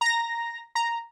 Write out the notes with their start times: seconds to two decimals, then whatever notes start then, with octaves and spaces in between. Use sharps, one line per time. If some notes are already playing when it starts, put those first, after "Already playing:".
0.01 A#5 A#6
0.75 A#5